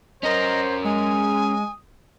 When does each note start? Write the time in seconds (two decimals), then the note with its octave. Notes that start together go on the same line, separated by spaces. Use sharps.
0.23 C#4 A#4 C5 D#5
0.85 G#3 G#5 D#6